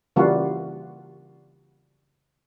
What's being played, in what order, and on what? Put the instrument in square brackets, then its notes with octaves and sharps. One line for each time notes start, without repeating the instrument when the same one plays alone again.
[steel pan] C#3 E3 G3 A#3 F4 F#4